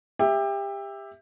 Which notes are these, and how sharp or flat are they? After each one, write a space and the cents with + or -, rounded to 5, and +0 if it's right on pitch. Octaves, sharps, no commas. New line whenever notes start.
G4 +25 E5 +0 G5 +25